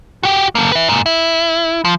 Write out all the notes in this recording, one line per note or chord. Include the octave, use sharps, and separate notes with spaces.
F#4 G4
D3 A#3
B4 E5
G#2 A#3
E4
F3